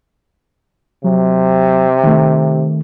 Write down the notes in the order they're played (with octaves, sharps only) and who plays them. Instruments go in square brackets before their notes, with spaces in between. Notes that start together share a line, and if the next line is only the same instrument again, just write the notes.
[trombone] C3 [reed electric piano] F#3
[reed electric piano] D#3 A3